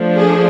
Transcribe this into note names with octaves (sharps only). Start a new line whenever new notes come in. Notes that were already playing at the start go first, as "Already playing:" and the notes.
Already playing: F3 A3 D4
G#4